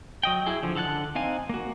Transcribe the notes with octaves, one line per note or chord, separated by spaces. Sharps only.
F#3 D#5 G5
E4 G#4
D3 F3
D3 A4 F#5 A5 F#6
C4 D#4 F5 G#5
A#3 F#4